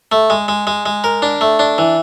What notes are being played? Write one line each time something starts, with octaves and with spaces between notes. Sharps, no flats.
A3
G#3
G#3
G#3
G#3
A#4
D4
A3
D4
E3